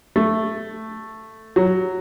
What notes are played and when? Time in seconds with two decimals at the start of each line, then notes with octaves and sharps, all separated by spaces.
0.16 A3
1.56 F#3